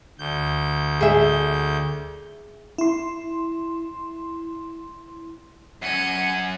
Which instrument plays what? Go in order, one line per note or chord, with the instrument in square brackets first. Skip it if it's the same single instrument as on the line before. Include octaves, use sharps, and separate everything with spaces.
[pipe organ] D2 G6
[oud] G#4 E5
[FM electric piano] E4 C6
[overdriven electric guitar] F#2 C#4 [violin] C#7 D#7